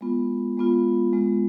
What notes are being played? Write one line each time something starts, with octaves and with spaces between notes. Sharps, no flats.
G#3 B3 F4
G#3 B3 F4
G#3 B3 F4